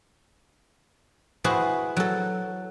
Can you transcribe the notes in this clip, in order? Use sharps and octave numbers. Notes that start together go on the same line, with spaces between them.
E4 F#4 G#4 B4 C5
F#3 A4